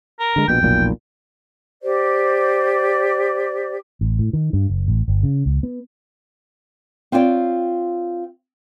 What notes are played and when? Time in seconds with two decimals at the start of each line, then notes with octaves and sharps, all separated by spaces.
0.20 A#4
0.36 D3 G#3
0.48 A#1 B2 G5
0.62 F1 B1 A#2
1.82 G4 C5 D5
4.01 A1
4.19 A2
4.33 D#3
4.53 G2
4.69 F#1
4.88 A1
5.08 G1
5.23 C#3
5.46 C#2
5.63 B3
7.12 C4 F4 C#5 D5 G5